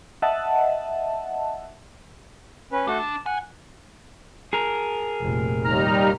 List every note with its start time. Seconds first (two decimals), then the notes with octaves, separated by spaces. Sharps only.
0.22 D#5 E5 F#5 A5
2.72 C#4 B4
2.88 A3 D4 F#4 A4
2.99 A5
3.26 F#5 G#5
4.53 G#4 A#4
5.20 F1 A#2
5.65 D#2 G3 D#4 A#5 F6